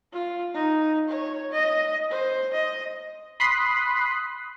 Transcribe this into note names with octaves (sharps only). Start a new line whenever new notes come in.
F4
D#4
C#5
D#5
C5
D#5
B5 C6 D#6 F#6 B6 C7